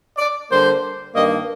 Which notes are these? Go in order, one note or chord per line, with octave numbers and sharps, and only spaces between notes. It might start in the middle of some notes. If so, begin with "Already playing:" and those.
D5
D3 G3 A#3 C5
G2 D#3 A#3 D#5